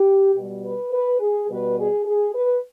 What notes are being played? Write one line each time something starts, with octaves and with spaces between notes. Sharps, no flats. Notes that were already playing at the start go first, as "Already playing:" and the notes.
Already playing: G4
B2 G3
B4
B4
G#4
B2 G3 B4
G#4
G#4
B4